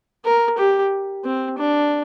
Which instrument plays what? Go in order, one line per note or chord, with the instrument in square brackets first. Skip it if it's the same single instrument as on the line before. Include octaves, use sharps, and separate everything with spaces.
[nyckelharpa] A#4
G4
C4
D4